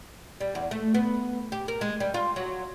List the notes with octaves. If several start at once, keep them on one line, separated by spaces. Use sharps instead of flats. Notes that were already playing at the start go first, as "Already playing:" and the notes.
G3
E2
A3
B3
G4
A#4
G#3
G3
F4
F#3